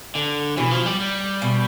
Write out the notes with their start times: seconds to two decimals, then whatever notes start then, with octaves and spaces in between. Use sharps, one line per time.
0.15 D3
0.57 B2 E3
0.71 F3
0.86 G3
1.00 G3
1.42 B2